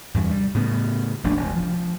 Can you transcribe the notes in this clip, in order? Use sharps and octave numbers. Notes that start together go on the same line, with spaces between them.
E2 G2 C3
G3
A2 C#3 B3
F1 A#1 A3 D4
E1
F3